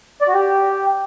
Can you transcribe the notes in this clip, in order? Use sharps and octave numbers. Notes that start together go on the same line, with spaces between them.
D5
F#4
G4